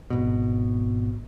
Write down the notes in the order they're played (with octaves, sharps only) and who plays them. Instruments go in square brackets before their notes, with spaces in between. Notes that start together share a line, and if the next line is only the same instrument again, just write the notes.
[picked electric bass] G#1 B2